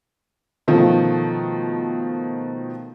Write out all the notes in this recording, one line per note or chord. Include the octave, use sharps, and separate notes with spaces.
B2 D#3 F3 A3